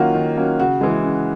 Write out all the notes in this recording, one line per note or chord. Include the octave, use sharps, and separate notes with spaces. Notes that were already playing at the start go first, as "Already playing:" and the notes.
Already playing: D#3 F#3 A#3 C#4 F4 F#4
D#3
F#3 A#3 C#4
C#3 F#4
E3 G#3
C#3